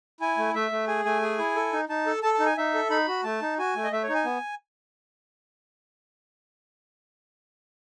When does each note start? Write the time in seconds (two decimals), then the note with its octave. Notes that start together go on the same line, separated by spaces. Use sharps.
0.20 E4 G#5
0.37 A3
0.54 A3 E5
0.71 A3
0.88 G#4 G#5
1.05 A3 G#5
1.22 G#4
1.39 E4
1.55 A4
1.73 D#4
1.89 D#4 A5
2.06 A4
2.23 A4 A5
2.34 A5
2.40 D#4
2.46 G#5
2.57 D#4 E5
2.74 A4
2.90 D#4 B5
3.08 F#4
3.24 A3 A5
3.42 D#4
3.58 F#4 G#5
3.76 A3
3.84 D#5
3.91 A3 E5
4.03 C#5
4.09 D#4
4.14 G#5
4.25 B3